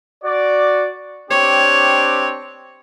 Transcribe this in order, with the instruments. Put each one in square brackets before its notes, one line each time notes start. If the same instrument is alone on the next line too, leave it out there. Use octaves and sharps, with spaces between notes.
[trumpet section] F#4 D5
[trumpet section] C4 D4 G4 [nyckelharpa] C#5